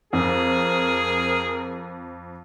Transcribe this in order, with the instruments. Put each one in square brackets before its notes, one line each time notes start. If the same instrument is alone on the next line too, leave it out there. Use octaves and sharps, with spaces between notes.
[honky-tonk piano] F2 [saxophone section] C4 A#4 [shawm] G#4